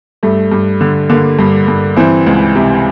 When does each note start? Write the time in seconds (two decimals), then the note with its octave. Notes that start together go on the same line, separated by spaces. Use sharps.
0.23 G2 A3
0.52 G2
0.81 D3
1.09 D3 A#3
1.39 G2
1.68 G2
1.97 E3 C4
2.27 C#2
2.55 C3